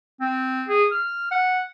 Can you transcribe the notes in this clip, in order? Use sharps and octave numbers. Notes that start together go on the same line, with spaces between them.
C4
G#4
F6
F#5